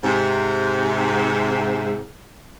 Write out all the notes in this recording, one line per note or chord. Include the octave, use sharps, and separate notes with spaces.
G#2 C3